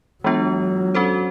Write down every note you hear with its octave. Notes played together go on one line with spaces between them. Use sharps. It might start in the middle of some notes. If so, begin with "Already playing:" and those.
E3 F#3 G#3 B3 D4 F4
C#4 F#4 A4 C5